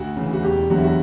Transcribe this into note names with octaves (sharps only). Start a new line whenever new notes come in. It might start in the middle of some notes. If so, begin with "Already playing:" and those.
Already playing: D2 F#4
C#3 E3
F#4
E1 G4
E2 D3 F#3 F#4
E4
F#4